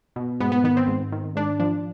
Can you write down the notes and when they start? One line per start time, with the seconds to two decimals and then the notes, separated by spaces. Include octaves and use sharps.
0.16 B2
0.40 G#2 B3
0.52 B3
0.64 D#3 B3
0.77 C4
0.88 G#2
1.12 D#3
1.36 G#2 D4
1.60 F3 D4